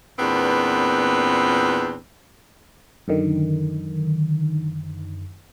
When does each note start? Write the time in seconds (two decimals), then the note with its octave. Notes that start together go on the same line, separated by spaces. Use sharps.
0.19 E2 A#2 B3 C4 D4
3.08 F#2 D3 D#3